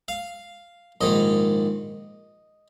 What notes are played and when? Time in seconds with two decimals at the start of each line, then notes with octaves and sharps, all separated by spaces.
0.08 F5
1.01 A#1 G#2 D#3 D#5